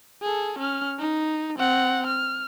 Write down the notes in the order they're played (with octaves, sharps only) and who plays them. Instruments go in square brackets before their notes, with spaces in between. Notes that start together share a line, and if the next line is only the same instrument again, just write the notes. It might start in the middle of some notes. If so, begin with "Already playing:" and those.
[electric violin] G#4 A4
C#4 F6
D#4
C4 F#5
F6